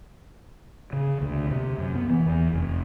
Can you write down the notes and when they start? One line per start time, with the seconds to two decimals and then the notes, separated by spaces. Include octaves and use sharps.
0.93 C#3
1.22 D2
1.51 C3
1.78 F#2
1.95 B3
2.10 E3
2.26 E2
2.53 F1